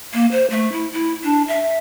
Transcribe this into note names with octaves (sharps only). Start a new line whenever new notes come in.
A#3
C5
A3
E4
E4
D4
E5